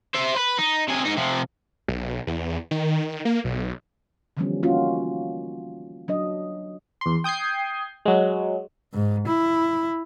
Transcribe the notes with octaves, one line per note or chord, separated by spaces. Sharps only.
C5 E5
B4
D#4
C3 G#4
G#2 D#4
C3 F3
B1
E2
D#3
A#3
B1
D3 E3 F3 G3 B3 C#4
G3 A#3 C#4 D#4 F4 F#4
F#3 D4 D#5
E2 C6
G5 D#6 G6 G#6 C7
F#3 G#3
G#2
E4